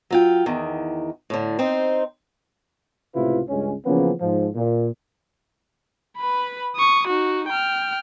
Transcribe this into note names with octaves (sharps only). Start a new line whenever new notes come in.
F#3 F4 G5
E2 D#3
A2 D3
C4 D#4 C5
C#2 A2 C3 E4 F4 B4
C#2 G2 G#3 C#4
C#3 E3 F3 A#3 B3 C#4
G#2 F3
A#2
B4 B5
C#6 D#6
D#4 F#4
G5 F6